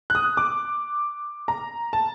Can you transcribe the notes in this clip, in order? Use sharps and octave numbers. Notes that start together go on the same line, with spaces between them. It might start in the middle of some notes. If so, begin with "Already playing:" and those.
F#6
D#6
D6
A#5
A5